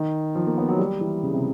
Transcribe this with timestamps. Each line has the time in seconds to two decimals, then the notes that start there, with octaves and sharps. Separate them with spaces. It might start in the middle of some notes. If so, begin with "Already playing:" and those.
Already playing: D#3
0.35 F3
0.46 A#3
0.57 B3
0.69 F#3
0.79 G3
1.01 E3
1.23 C#3
1.34 C3